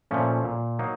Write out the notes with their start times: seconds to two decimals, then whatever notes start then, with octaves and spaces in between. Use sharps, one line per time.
0.11 A#2 F3 A3 C#4
0.45 A#2
0.79 F#3 A#3 D#4